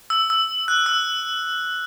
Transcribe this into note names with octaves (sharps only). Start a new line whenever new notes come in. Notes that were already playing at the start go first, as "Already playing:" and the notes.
E6
E6
F#6
E6